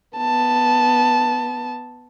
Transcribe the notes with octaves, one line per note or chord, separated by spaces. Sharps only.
B3 A5